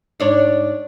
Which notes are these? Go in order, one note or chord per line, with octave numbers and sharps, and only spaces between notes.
G#2 D4 C#5